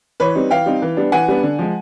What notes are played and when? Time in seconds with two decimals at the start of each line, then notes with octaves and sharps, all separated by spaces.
0.20 E3 B4 C#5
0.35 G3 C4 D#4
0.51 E3 F5 G5
0.66 G3 C4 D#4
0.82 E3
0.97 G3 B3 D4
1.12 E3 F#5 G#5
1.28 G3 B3 D4
1.43 D3
1.59 F3 G#3